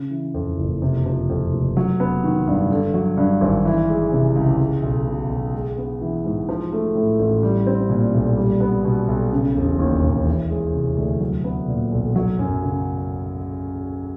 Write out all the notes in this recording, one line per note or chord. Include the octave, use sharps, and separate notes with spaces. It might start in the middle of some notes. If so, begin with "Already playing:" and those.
Already playing: C#3
E3
F2
F#1
C3
F3
F2
F1
F#3
B3
D#3
G2
D3
F#3
G2
G#1
E3
G#3
C3
C#2
G#3
B1
B2
B1
G#3
B3
E3
G#2
F3
A3
A2
A1
G3
C4
A#2
B1
G3
B3
B2
B1
C#3
E1
D#2
E1
E3
G#3
C3
D2
F#3
B3
A#2
B1
F#3
F#2
C#3